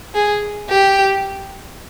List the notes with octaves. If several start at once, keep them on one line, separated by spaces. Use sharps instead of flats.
G#4
G4